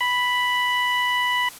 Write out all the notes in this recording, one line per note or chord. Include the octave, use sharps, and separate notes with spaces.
B5